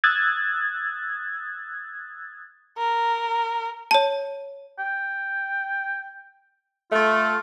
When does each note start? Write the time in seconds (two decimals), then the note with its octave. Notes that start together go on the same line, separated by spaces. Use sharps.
0.04 D#6 E6 F#6 G#6 A6
2.78 A#4
3.91 C#5 A5
4.79 G5
6.92 A3 F4